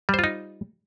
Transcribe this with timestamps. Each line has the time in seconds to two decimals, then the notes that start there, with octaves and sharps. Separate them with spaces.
0.09 G3
0.14 C5
0.19 F4
0.24 D#4